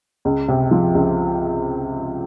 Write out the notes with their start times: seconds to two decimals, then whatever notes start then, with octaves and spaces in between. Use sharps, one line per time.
0.25 C#2
0.48 C3
0.71 F3
0.95 C#2